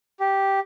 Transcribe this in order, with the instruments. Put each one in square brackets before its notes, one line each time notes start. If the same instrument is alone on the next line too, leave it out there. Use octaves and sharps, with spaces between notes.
[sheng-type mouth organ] G4